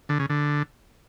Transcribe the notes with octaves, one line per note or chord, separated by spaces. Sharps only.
D3
C#3
D3